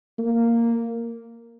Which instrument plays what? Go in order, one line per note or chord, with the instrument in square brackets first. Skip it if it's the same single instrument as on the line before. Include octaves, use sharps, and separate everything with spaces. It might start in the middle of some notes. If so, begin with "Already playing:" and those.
[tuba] A#3